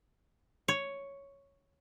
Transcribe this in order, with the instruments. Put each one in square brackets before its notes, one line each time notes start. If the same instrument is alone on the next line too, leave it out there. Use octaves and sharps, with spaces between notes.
[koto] C#5